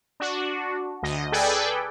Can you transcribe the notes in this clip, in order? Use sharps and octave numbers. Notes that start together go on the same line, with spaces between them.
D4 F#4
D2 D#5
G#4 A4 B4 D5 G5 G#5